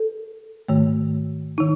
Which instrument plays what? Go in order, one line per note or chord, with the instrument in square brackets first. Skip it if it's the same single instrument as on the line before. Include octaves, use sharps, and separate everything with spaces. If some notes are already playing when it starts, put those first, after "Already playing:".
Already playing: [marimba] A4
G#2 D#3 A3
D#3 D#4